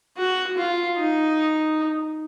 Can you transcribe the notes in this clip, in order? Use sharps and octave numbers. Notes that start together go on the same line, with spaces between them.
F#4
F4
D#4